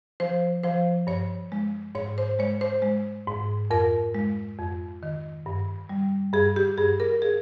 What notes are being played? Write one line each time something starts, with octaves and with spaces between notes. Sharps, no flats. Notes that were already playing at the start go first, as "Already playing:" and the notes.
F3 C5
F3 C5
G2 C#5
G#3
G#2 C#5
C5
G#3 C#5
C5
G#3
G#2
F2 A#4
G#3
F2
D#3
G2
G3
G2 G#4
G4
G2 G#4
A#4
G#4